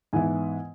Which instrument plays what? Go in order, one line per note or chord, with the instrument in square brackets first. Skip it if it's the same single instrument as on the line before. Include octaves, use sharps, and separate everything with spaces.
[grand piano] G#2 E3 B3 E4 G#5